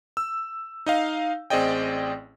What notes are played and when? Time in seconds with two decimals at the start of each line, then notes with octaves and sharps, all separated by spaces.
0.17 E6
0.86 D#4 D#5 F5
1.50 A1 C4 G#4 D5 D#5 G5